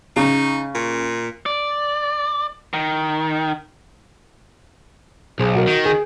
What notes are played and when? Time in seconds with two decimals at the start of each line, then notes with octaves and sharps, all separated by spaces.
0.16 C#3 D#4
0.75 A#2
1.46 D5
2.74 D#3
5.39 B1 G#4 C5
5.55 F#4 A#4
5.68 D#3
5.85 G#4